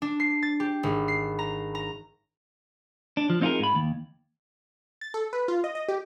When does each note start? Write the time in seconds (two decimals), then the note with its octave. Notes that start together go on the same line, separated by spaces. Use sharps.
0.02 D4
0.20 C7
0.42 A6
0.60 G4
0.83 G#1
1.08 C7
1.39 A#5
1.75 A#5
3.17 D4
3.30 F3
3.41 C4 D#4 F4 G4 G#4 A#4
3.59 G#2 B5
3.75 D#2
5.01 A6
5.14 A4
5.33 B4
5.48 F4
5.64 D#5
5.75 D#5
5.88 G4